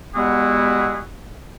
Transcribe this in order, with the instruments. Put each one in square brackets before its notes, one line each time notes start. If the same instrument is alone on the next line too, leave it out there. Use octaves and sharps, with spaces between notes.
[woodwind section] G3 G#3 B3 E4 F#4 G#4